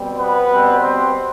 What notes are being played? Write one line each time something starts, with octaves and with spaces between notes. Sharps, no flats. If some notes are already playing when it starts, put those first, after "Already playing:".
Already playing: B2 G3 C4
B3 B4
B2 G3 C4
C4 C5